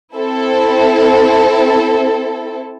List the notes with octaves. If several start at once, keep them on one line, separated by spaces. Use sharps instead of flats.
C4 E4 A4